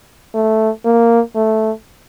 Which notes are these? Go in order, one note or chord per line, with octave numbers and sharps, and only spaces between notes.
A3
A#3
A3